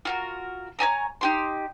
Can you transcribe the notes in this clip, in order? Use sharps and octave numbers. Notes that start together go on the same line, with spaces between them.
F4 F#4 A#4
C#5 D#5 G#5 A#5
D#4 G4 C6